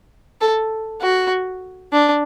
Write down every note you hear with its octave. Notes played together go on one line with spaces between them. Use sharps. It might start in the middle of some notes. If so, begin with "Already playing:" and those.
A4
F#4
D4